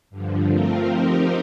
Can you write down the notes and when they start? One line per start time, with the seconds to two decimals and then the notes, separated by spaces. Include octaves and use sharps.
0.10 G2 D3 F3
0.48 F3 A3 C4 F4 A#4
0.87 F3 C4 D#4 G4 A#4